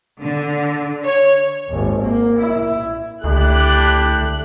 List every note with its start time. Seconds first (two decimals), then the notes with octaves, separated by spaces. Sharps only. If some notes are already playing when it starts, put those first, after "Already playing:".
0.22 D3
1.04 C#5
1.67 G#1 D#2
1.99 A#3
2.39 E4
3.24 C#2 D3 A3 D4 E4 G4 F#6